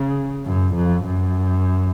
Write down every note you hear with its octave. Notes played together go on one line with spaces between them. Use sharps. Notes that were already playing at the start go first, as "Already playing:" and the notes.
Already playing: C#3
F#2
F2
F#2